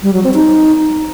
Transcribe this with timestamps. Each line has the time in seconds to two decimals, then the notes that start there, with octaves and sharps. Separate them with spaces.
0.03 G3
0.13 F#3
0.24 C4
0.34 D#4